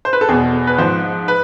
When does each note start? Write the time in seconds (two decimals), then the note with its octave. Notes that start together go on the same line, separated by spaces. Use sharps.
0.05 C5
0.13 B4
0.21 A4
0.28 E2 G#4
0.32 B2
0.67 B4
0.78 G#2 F3 C5
1.28 B4